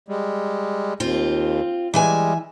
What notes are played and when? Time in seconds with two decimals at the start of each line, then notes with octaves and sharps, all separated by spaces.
0.09 G3 G#3
1.00 D#2 C4 F4
1.94 E3 G3 G#3 E5 G#5